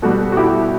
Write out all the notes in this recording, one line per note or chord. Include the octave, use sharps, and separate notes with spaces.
B2 G3 F#4 A4
F#4
E4 G4